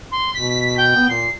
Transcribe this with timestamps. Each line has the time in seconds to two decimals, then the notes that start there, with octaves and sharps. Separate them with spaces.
0.11 C6
0.34 B2 B6
0.77 G5
0.96 B3
1.09 A#2 C7